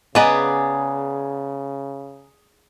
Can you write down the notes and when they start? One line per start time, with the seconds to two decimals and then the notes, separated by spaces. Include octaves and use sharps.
0.15 C#3 B3 G#4 B4 D5 D#5 G#5 A#5